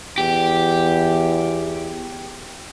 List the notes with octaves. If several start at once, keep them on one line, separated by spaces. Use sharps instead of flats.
E2 G4